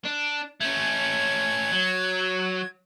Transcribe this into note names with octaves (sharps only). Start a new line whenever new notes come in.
D4
A3 C#4 G#6
F#3